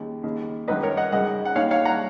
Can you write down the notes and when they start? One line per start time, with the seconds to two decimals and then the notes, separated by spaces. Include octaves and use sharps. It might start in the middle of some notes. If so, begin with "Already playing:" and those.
Already playing: D#2 C#3
0.23 D#2 C#3
0.68 G#1 F#2 D#3 B4 D#5
0.83 A#4 C#5
0.97 D#5 F#5
1.12 G#1 F#2 C#3 D#5 F#5
1.45 F#5
1.56 D#2 D#3 C#5 F5
1.71 C#5 F5
1.85 F#5 A#5